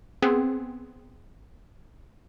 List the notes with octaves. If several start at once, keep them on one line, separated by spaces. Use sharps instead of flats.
B3 C4 G#4